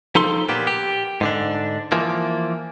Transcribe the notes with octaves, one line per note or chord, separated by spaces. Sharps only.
F3 D#4 A4 C6
A#2 A#3 B3 G4
G4
G#2 D3 D4
E3 F3 A#3